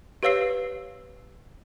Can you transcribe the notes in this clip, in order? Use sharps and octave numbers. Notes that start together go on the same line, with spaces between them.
G4 B4 C#5 F5 E6 C7